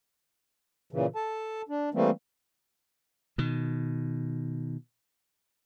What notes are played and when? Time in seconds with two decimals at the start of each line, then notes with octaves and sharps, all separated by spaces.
0.93 A#2 C#3 E3
1.15 A4 A5
1.69 D4
1.94 E3 G3 A3 A#3 C4
3.38 B2 D#3